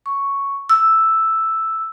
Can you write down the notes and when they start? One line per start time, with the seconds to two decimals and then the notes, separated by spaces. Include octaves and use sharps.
0.06 C#6
0.69 E6